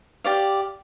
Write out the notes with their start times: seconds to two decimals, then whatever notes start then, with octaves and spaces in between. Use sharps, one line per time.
0.24 G4 D5 F5